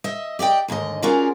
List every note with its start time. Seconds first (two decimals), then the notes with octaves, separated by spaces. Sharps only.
0.04 D#5 E5
0.39 G4 D5 D#5 G5
0.68 D#2 G#2 D3 D#5
1.02 C#4 F4 F#4 G#4 A#4 D5